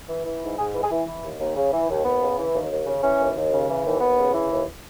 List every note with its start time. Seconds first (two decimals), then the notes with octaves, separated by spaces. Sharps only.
0.09 E3
0.26 E3
0.43 G#2
0.58 G#2 G#4
0.74 E3
0.83 G#4
0.91 E3
1.08 E3
1.23 D#2
1.40 D#2
1.56 C#3
1.73 E3
1.90 D#2
2.05 D#2 B3
2.21 C#3
2.38 E3
2.54 D#2
2.71 D#2
2.87 C#3
3.03 E3 C#4
3.19 D#2
3.36 D#2
3.52 C#3
3.68 E3
3.84 D#2
4.01 D#2 B3
4.17 C#3
4.33 E3
4.50 D#2